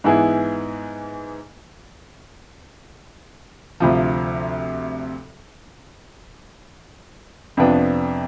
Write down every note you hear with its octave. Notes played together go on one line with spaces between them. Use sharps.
G#2 E3 B3 E4 G#4
D2 C3 F3
F2 C3 F3 B3 D4